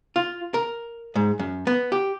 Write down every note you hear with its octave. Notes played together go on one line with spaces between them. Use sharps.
F4
A#4
G#2
F#2
B3
G4